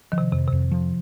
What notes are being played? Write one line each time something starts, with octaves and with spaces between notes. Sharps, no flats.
D#3 F3
C3
F2 C3
F2 C3
F3